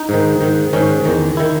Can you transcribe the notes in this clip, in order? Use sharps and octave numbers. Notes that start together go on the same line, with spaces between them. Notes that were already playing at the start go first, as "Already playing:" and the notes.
Already playing: D#4
G#2 D#3
G#2 D#3
G#2 D#3 C#4
E2 D#3
D#3 E4